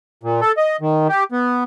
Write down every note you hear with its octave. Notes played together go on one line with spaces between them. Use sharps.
A#2
A4
D#5
D#3
G4
B3